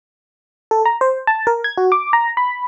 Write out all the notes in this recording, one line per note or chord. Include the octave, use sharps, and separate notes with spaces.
A4
A#5
C5
A5
A#4
G#6
F#4
D6
A#5
B5